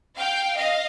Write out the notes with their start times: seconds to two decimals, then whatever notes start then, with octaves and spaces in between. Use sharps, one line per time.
0.18 F5 G5
0.57 D#5 F5